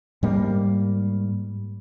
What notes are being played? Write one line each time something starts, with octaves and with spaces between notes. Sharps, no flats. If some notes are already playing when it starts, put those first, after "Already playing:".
G#2 G3 A#3